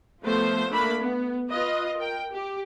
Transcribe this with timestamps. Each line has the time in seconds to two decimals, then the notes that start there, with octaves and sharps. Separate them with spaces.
0.23 F3 A3 B3 C5
0.70 A3 A#3 D4 B5
0.99 B3
1.52 F4 B4 D#5
1.97 A#4 G5
2.32 G4